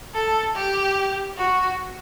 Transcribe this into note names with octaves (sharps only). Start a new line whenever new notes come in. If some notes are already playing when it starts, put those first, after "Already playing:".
A4
G4
F#4